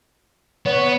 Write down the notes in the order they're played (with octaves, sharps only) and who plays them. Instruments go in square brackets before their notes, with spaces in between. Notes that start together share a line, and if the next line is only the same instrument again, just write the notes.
[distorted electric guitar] B3 [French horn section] C#5